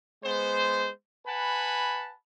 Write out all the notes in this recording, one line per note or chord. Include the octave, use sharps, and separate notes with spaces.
G#3 B3 C5
B4 F#5 G#5 A5 B5